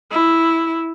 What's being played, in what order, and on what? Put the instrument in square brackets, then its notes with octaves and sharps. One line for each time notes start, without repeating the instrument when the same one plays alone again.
[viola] E4